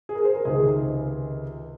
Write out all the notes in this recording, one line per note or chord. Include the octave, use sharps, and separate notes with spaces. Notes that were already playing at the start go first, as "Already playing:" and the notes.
G#4
A#4
C5
A#4
C#2 C3 D#3 G#4